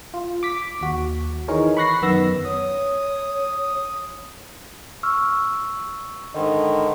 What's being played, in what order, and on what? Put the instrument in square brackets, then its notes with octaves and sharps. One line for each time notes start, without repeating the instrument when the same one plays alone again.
[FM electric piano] F4
D6 B6
D#2 F#4
D#3 E3 D#4 G#4 A#4 C#5
B5 C#6 F#6 A#6 C7
F#2 D#3 B3 E6 A#6
[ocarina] C#5 [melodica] D#6
[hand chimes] C#6 E6 F6
[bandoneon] G#2 D3 D#3 [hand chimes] D#5